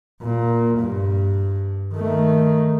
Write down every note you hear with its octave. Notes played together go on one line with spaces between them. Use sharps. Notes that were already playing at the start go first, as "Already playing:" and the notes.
A#2
G2
D#3 A3